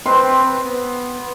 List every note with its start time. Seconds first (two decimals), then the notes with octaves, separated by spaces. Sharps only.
0.06 C4 B4 C6
0.64 B3